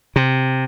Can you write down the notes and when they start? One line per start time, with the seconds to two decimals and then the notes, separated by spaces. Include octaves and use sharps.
0.16 C3